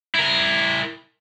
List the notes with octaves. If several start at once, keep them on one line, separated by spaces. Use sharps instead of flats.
E4 A#4